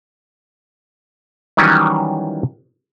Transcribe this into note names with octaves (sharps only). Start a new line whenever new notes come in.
D#3 E3 F#3 G3 C#4